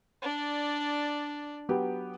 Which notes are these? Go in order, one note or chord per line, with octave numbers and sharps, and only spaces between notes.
D4 D5
F#3 B3 G4